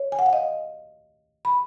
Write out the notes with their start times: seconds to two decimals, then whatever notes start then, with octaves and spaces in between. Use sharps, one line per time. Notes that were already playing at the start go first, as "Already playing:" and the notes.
Already playing: C#5
0.12 G#5
0.19 F#5
0.26 F5
0.33 D#5
1.45 B5